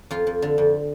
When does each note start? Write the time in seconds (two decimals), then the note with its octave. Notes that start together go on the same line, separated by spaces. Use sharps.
0.11 F2 F4
0.27 F2
0.42 D3
0.58 F2